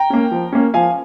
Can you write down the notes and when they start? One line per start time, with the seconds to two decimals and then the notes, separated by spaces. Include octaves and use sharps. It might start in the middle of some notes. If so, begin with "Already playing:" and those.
Already playing: G5 A#5
0.10 A#3 C#4
0.31 F3
0.52 A#3 C#4
0.74 F3 F5 G#5